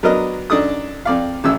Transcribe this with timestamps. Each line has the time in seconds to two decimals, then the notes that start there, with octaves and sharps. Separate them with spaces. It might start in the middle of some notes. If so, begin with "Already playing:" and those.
0.03 F#3 B3 D4 A#4 D#5
0.50 F#2 D4 D#4 A4 D#6
1.05 F2 D5 F5
1.44 A1 F#2 E6